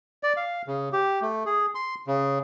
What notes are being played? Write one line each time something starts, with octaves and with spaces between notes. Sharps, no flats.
D5
F5
C#3
G4
A3
G#4
C6
C#3